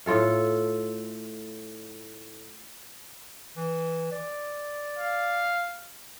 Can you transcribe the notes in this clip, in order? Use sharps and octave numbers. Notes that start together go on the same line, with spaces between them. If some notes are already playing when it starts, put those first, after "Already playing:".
A2 F4 A4 F5
E3
D5
F5